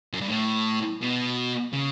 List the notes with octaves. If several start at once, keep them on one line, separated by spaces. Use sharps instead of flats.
F#2
G2
A2
B2
C#3